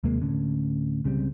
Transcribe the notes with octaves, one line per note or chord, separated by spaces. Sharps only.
D#2 C3 G#3 A#3
D2 A2 D3 C#4
C#2 C#3 G3 C4